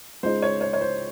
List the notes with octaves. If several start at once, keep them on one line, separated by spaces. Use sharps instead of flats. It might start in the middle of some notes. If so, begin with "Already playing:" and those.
C#2 C#3 G#3 D#4 C5
C#5
C#5
C#5
C5